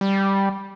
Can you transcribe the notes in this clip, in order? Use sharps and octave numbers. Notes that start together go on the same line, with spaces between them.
G3